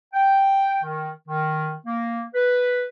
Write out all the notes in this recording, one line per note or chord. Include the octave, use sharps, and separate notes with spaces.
G5
D#3
D#3
A#3
B4